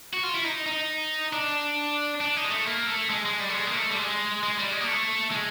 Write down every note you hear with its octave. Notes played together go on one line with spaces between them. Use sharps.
F#4
F4
E4
D#4
D#4
D4
D4
D#4
G#3
A3
A#3
A3
G#3
G#3
G3
A3
G#3
A#3
A3
G3
G#3
G#3
G3
G#3
A#3
A3
G#3